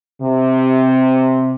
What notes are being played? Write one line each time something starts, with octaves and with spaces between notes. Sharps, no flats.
C3